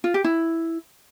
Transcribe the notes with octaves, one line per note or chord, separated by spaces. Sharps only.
F4
G4
E4